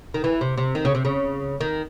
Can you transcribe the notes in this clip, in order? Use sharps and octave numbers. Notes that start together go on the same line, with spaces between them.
D#3
E3
C3
C3
D#3
C#3
C3
C#3
D#3